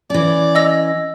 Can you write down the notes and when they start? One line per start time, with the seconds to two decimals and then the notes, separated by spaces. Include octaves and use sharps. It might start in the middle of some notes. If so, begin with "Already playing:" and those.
0.10 E3 C#4 D5
0.55 D#5 E6 A#6